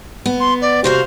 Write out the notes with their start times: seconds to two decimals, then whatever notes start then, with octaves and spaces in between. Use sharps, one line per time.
0.26 B3
0.40 C6
0.61 D5
0.84 C3 F#4 C5 F5